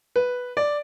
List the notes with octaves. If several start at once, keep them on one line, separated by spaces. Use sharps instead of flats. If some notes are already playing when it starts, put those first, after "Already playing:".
B4
D5